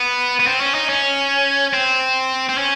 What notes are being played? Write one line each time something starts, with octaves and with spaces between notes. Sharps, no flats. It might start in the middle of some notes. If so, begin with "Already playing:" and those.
Already playing: B3
B3
C4
C#4
D#4
C#4
C4
C4
C#4